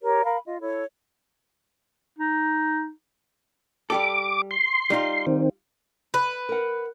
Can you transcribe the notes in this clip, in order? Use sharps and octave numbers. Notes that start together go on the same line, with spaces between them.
G4 A#4 C#5
A#4 F5 B5
F4 D#5
E4 A4 C#5
D#4
G3 G4 A4 D6
C6
G3 D#4 F4
D#3 C4
B4
A#4 F#5